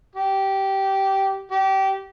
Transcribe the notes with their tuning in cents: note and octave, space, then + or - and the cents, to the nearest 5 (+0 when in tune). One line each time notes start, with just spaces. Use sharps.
G4 -15
G4 -25